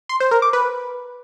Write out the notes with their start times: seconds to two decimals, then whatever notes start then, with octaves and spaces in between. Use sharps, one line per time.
0.09 C6
0.20 C5
0.31 A#4
0.42 D6
0.53 B4